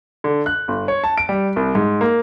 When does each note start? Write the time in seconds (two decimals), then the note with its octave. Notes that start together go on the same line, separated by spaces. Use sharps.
0.24 D3
0.46 F#6
0.68 G1
0.88 C#5
1.04 A5
1.18 D7
1.29 G3
1.56 C2
1.75 G#2
2.01 A#3